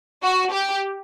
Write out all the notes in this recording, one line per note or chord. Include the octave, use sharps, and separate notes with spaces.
F#4
G4